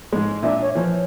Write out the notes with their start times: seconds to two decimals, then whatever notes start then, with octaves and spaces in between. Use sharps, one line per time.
0.12 G#2 G#3
0.43 A#2 D4 E5
0.62 C#5
0.75 E3 F3 C#5